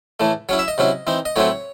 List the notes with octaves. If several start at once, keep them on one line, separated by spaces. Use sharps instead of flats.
A2 E3 A3
F#3 C#4 E4 C#5
E5
D#5
C3 F#3 C#4 E4
E3 C4 D#4
D#5
A2 F#3 C4 E4 C#5